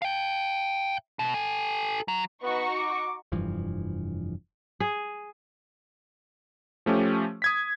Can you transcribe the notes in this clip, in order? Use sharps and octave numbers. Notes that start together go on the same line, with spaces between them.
F5 G5
B2
A4 G#5
F#3
B3 D#4 F#4 B4 C#6
D6
F1 G2 E3 F3
G#4
F3 A3 C#4 G4
D#6 G#6 B6